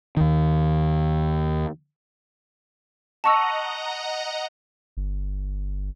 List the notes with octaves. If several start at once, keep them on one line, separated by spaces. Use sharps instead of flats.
D#2 D#3
D#5 F#5 A5 A#5 C#6 E6
G1